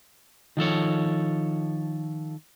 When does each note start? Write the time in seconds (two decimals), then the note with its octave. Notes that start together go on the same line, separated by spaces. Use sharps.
0.57 D#3 F3 A4 C#5